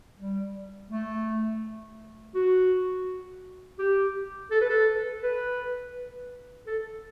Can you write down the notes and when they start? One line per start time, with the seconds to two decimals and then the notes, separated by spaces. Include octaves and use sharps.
0.19 G3
0.91 A3
2.34 F#4
3.79 G4
4.51 A4
4.61 B4
4.69 A4
5.23 B4
6.67 A4